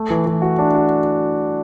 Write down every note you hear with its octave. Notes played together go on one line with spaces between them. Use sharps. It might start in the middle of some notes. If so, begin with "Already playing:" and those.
Already playing: A3
E3
E3
F#4
D4
F#4